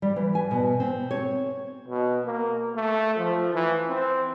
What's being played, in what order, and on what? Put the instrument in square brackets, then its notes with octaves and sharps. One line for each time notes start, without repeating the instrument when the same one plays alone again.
[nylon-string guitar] G3
E3
G#5
B2
C4
C#5
[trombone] B2
A#3
A3
F3
E3
C4